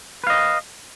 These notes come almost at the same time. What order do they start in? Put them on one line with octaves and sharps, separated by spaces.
B4 F5 D#5